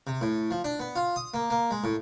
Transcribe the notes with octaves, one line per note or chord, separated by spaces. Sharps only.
C3
A2
F3
D4
B3
F4
D#6
A#3
A#3
G#3
A2